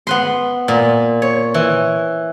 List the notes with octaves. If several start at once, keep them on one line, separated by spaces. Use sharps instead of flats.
B3 B4 C6
A#2
C#5
E3